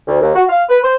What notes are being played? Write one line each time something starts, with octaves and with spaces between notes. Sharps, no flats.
D2
D#2
F#4
F5
B4
C5